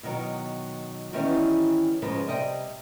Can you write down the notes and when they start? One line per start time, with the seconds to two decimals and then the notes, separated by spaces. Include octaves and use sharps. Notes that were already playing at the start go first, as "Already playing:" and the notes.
0.03 B2 D#3 F#3
1.13 D#3 E3 G3 B3 C#4
2.02 G#2 C#3 F3 G#3 B4
2.27 C3 G3 D5 D#5 G5